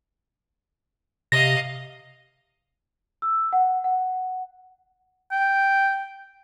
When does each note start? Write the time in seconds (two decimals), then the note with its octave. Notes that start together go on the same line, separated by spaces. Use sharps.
1.32 C3 D#5 F5 A#6
3.22 E6
3.53 F#5
3.84 F#5
5.32 G5